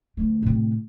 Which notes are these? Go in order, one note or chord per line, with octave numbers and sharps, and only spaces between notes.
D2 A3
A2 C3